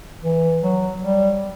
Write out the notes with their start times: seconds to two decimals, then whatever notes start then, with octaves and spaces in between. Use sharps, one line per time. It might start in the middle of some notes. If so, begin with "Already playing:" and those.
0.23 E3
0.63 F#3
1.02 G3